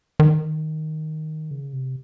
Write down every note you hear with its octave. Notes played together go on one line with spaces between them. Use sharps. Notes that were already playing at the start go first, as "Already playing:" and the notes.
D#3
C#3
C3